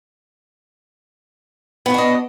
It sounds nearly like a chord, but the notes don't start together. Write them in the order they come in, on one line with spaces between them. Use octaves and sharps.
B3 F#4 D4 D#5